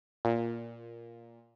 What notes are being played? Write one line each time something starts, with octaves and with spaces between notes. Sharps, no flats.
A#2